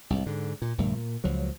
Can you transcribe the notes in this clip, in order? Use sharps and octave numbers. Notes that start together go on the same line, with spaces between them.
C2 G#2
G#2 D3
A#2
A#1 G2 D3 A3
A#2
C#2 F3 F#3